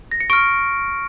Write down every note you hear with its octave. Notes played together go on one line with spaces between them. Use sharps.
A#6
C#7
C#6 F6 D7